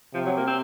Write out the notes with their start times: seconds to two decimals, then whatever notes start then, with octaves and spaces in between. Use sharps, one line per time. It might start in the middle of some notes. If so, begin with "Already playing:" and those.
0.14 C3 F3
0.26 F#3
0.37 A#3
0.47 C4